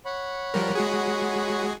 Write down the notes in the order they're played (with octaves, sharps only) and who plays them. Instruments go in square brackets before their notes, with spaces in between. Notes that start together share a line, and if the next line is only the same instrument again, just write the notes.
[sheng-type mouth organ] C#5 F#5 B5
[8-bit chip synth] F3 G3 A#4
G#3 F#4 G#4